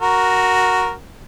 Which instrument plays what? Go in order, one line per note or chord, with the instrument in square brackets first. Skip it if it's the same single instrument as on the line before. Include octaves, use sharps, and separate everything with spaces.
[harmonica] F#4 A#4